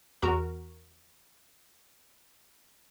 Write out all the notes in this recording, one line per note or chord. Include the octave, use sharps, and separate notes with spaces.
E2 F#4 A#4 A#5